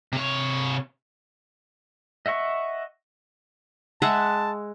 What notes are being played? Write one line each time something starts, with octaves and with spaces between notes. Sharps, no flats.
C3 C#5
D#5 E5 F#5 C#6
G#3 E5 F#5 A5